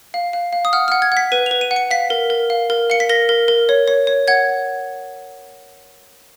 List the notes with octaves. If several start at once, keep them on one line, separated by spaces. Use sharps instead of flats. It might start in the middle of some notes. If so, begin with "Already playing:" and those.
F5
F5
F5
D#6
F#5 F6
F#5 F6
G#6
F#5 B6
B4 D#7
B4 F7
D#7
F#5
C#7
F5 B6
A#4
A#4
F5
A#4
F5 C#7
B6
A#4 A#6
A#4
A#4
C#5
C#5
C#5
F#5 G#6